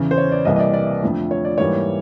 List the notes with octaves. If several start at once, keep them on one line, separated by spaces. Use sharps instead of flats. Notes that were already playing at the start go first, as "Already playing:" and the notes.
Already playing: E2 C#3 E3
C5
C#5
D5
C2 C3 E3 G3 A#3 D#5
D#5
D5
D5
F2 D3 F3 A3
C#5
D5
G#2 E3 G3 A#3 C#5